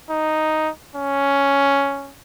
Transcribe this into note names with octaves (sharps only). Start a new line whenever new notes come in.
D#4
C#4